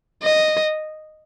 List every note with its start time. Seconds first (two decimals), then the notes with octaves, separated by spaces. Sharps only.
0.23 D#5